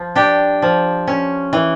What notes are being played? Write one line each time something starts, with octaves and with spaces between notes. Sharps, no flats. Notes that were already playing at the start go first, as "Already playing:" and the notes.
Already playing: F3
D4 G4
F3
C#4
E3